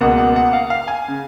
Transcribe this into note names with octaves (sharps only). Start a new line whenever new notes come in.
C#2 B2 A#3 F#5
F#5
F#5
F5
F5
G#5
C#3